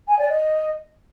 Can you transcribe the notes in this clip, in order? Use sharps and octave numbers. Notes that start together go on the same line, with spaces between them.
G#5
D5
D#5